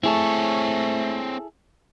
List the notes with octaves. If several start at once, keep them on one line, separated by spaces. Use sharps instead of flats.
A3 C4 E4 G#4 A4 C#5